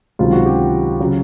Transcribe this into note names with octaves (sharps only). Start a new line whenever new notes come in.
C#2 C3 D#3 F#3 F4
F#4
G4
C#3 F#3